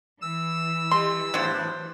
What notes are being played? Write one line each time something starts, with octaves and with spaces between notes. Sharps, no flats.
E3 E6
G3 C6
G#2 F#3 B3 D4 C5